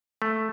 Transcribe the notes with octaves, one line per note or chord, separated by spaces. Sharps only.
A3